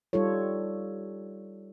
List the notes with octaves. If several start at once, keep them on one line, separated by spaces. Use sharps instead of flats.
G3 D#4 F4 A4 C#5